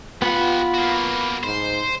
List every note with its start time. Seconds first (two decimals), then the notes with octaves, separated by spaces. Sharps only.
0.22 B3 F4 G4 B4 F#5
0.74 A#3 F#4
1.43 G#2 C5